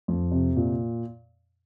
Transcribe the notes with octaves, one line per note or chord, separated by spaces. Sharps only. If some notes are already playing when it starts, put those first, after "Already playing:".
F2
C3
A#2